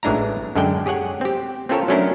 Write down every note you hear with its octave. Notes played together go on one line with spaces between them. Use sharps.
A1 E3 G#3 D4 E4 A#5
F#2 D3 G#3 A4 D5 G5
G4 G#4 C#5 F#5 G#5
C4 G4
C4 C#4 F4 A4 A#4 C#5
F#3 A3 C#4 D4 E4 A#4